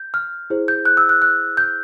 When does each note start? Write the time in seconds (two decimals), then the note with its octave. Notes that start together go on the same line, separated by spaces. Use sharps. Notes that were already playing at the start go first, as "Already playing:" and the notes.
Already playing: G6
0.14 F6
0.50 E4 G#4 C5
0.68 G6
0.85 F#6
0.97 E6
1.09 F#6
1.22 F#6
1.57 G6